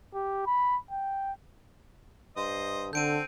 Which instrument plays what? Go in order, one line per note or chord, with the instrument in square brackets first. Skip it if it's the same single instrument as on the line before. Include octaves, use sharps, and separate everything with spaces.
[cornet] G4
B5
G5
[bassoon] G2 [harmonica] C5 D#5
[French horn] D3 [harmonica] C4 [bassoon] A4 [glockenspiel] G6 D7 D#7